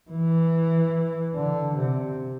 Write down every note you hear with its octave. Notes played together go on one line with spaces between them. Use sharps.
E3
D3
C3